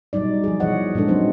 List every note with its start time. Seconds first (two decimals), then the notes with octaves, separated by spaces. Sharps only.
0.13 B2 F#3 G3 D#4 D5
0.44 F3 G#4
0.60 B2 E3 G3 C#5 D#5 F#5
0.95 A#2 F3 G#3 D4 A4
1.08 F#3 G3 C4 D4 D#4 C5